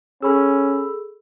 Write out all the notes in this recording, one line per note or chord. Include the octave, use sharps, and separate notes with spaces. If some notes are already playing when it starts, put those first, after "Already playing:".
C#4 G#4 A4 B5 E6